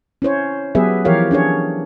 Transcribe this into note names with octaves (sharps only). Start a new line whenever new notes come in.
C#4 E4 C5 C#5
F#3 B3 G4 G#4 B4 E5
E3 F3 G4 A#4 C#5 F5
C#4 D4 G#4 C#5